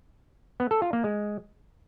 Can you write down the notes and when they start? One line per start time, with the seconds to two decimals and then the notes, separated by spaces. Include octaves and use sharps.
0.60 B3
0.71 A4
0.82 F4
0.93 A#3
1.04 G#3